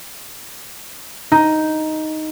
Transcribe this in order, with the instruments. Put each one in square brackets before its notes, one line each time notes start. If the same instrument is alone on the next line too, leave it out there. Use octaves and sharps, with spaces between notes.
[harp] D#4